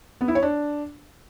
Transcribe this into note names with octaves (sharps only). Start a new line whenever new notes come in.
B3
E4
C#5
D4